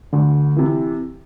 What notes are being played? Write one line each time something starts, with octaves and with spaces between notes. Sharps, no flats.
D2 D3
C3 E3